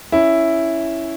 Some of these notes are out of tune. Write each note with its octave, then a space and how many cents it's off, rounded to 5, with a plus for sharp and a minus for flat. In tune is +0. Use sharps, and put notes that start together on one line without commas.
C#4 +5 E4 +0